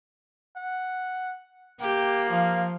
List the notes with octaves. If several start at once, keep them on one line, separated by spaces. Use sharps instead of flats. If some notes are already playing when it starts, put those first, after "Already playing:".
F#5
A#3 G4
F3 F5